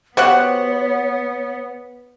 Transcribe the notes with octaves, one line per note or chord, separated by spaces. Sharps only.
B3 F#4 G4 C5 C#5 F#5